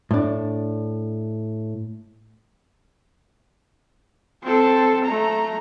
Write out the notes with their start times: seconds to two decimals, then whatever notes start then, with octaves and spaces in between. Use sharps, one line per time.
0.11 A2 D4
4.43 C4 A4
5.05 A3 A#5